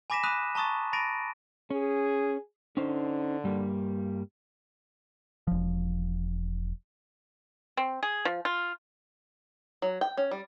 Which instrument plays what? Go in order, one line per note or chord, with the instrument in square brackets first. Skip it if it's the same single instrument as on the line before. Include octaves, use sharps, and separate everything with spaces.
[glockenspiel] G#5 B5 D6 A#6 B6 E7
B5 D#6 F#6 D#7
A5 A#5 C#6 D#6 A6
B5 A6 A#6 D7 D#7
[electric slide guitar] C#4 [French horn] G#4
[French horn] D3 [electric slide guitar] C#4 D#4 C5
[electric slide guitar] G2 G3 A#3
[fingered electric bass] E1 F3
[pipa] C4
G#4
F3
F4
[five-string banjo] F#3
G5
C#4
G3